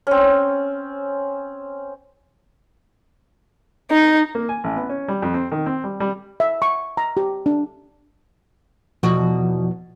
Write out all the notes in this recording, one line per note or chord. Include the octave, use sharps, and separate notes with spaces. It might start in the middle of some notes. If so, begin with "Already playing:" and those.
C4 C#4
D#4
A#3
G#5
A1
B3
C#4
G3
F2
C4
D#3
C4
G3
G3
E5
C#6
A#5
G4
D4
E2 B2 F3 F#4